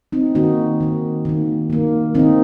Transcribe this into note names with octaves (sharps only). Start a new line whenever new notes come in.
C4 D#4
D#3 A#3 D#4 F#4
D#3 A#3
D#3 A#3
D#3 A#3
D#3 A#3 C4 D#4